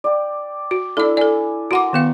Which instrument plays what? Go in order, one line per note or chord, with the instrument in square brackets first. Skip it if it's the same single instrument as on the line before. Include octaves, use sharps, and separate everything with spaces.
[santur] D5 G5
[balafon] F#4
[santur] D4 E4 E6 [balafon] A4 D5
[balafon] A4 D5 [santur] G#5
[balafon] F#4 F#5 D6 [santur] A#4 C6
[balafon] D#3 B3 F5